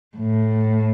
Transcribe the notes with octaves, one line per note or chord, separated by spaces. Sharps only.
A2